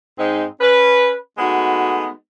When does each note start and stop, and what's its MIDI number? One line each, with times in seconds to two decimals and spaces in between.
0.18 0.44 44
0.18 0.44 56
0.18 0.44 60
0.18 0.44 63
0.60 1.13 61
0.60 1.13 71
1.38 2.09 56
1.38 2.09 57
1.38 2.09 59
1.38 2.09 63
1.38 2.09 66